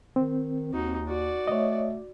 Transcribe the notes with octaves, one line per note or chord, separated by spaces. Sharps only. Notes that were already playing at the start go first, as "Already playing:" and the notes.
D#3 C4
D#2 D#4 F#4
F#4 D5
A3 C#5 D#5